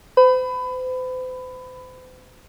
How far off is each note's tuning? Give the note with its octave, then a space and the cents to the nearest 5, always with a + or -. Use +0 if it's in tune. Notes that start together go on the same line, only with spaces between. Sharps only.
C5 -40 B5 +20